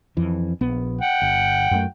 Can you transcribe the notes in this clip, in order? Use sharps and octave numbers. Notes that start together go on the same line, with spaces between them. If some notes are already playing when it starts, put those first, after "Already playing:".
F2 E3
A#1 B3
F#5 G5
G1
F#2 A3